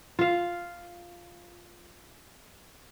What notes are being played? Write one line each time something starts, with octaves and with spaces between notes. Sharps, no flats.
F4 F5